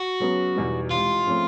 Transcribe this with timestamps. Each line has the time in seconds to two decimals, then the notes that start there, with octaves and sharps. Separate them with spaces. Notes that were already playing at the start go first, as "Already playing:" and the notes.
Already playing: F#4
0.20 C#3 F#3 B3
0.56 E2 B2 G3 B3 D#4
0.91 C#2 C3 E3 G3 F4
1.27 C#3 F3 A3 C4